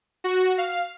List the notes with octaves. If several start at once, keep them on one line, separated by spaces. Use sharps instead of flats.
F#4
F5